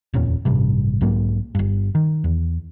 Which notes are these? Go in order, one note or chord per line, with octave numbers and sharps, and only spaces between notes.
D#1 F2 A#2 C#4
A1 G2 C3
B1 G#2 F#3 A#3
G1 G2
D#3
E2